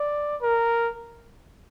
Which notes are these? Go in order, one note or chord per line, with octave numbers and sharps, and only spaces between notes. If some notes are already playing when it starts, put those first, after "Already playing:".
Already playing: D5
A#4